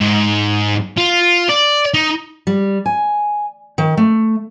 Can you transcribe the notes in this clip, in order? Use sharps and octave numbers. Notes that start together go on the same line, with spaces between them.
G#2
F4
D5
D#4
G3
G#5
D#3
A3